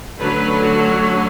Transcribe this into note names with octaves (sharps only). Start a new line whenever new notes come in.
D3 F#3 A3 C#4 B4
F#4